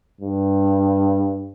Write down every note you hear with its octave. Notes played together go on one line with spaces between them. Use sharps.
G2